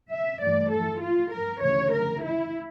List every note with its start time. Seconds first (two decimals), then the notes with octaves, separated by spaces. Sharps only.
0.11 E5
0.41 G2 E3 A3 D5
0.71 A4
1.01 F4
1.32 A#4
1.61 D2 C#3 E3 C#5
1.92 A#4
2.22 E4